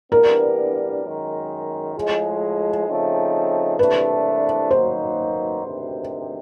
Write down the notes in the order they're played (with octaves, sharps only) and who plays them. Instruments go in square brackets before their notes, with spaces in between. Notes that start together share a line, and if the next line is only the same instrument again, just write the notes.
[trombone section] G2 E3 G3 B3 D4 [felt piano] A#4
[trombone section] F#2 D#3 G#3
A2 F3 G#3
C#3 F3 A3 C4 D#4
[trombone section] C2 C3 E3 A3 D4 [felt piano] B4
[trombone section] F#2 D#3 F#3 A#3 D#4 [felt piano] C5
[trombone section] D2 C3 D#3